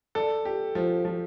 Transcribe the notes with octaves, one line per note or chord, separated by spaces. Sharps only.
A4 D5
G4
F3
F3